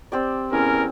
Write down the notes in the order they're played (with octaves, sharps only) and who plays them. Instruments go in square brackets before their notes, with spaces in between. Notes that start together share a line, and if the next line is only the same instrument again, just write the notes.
[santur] C4 G4 D5
[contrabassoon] E2 [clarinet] C#4 [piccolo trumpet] A#4